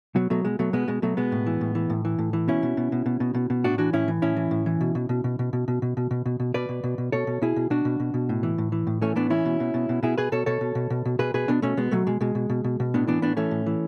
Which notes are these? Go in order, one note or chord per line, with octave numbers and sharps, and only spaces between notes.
B2 F#3
B2 F#3 A3
B2 G#3
B2 F#3 A3
B2 G#3 B3
B2 G#3
B2 F#3 A3
B2 G#3 B3
A2
E3
A2
E3
A2
E3
A2
E3
B2 C#4 E4
B2
B2
B2
B2
B2
B2
B2
A2 D4 F#4
E3 D4 F#4
A2 C#4 E4
E3
A2 C#4 E4
E3
A2
E3
B2
B2
B2
B2
B2
B2
B2
B2
B2
B2
B2
B2
B2 B4 D5
B2
B2
B2
B2 A4 C#5
B2
B2 E4 G#4
B2
B2 D4 F#4
B2
B2
B2
A2
E3
A2
E3
A2
E3 A3 C#4
A2 B3 D4
E3 C#4 E4
B2
B2
B2
B2
B2 E4 G#4
B2 G#4 B4
B2 A4 C#5
B2 A4 C#5
B2
B2
B2
B2
B2 G#4 B4
B2 G#4 B4
B2 B3 D4
B2 A3 C#4
B2 G#3 B3
B2 F#3 A3
B2 G#3
B2 G#3
B2
B2
B2
B2
A2 B3 D4
E3 B3 D4
A2 B3 D4
E3 A3 C#4
A2
E3